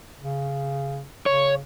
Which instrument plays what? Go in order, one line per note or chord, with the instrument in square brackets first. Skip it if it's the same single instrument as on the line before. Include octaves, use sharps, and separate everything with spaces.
[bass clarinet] C#3
[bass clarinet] C#3 [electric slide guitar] C#5